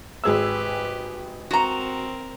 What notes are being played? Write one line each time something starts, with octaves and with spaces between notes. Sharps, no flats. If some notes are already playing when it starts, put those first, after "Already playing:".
G#1 G4 G#4 B4 E6
C4 F#4 A#4 A#5